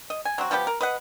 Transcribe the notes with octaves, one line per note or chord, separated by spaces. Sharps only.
D#5
G#5
F#3 C4 F#4
F3 B3 G4 B4
A#4
B4 D#5 F#5